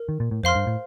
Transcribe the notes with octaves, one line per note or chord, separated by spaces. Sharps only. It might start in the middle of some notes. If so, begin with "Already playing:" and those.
Already playing: A#4
D#3
A#2
A2
F2 C5 F5 C6 F6
G2
A2